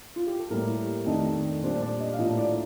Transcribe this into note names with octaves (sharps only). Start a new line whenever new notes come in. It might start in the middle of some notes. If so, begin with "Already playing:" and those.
F4
G4
A4
A2 G3 A#3 A#4
F2 D#3 A3 D4 D#5
A#2 G3 D4 C5
D5
D#5
F5
A2 F3 A#3 D4 D#5
D5